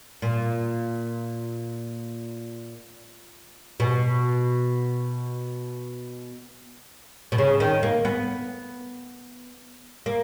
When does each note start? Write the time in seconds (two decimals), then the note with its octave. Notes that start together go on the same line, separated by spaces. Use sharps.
0.22 A#2
3.80 B2
7.32 B2
7.38 C#3
7.60 D#3
7.83 A#3
8.05 B3
10.06 A#3